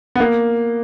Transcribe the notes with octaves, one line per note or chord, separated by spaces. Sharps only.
B3
A#3